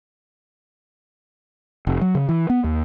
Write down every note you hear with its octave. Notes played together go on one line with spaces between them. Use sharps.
F1
F#3
C#3
E3
B3
D#2